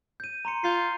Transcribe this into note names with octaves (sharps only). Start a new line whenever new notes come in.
G6 D#7
A#5 C6 C#7
F4 G6 C7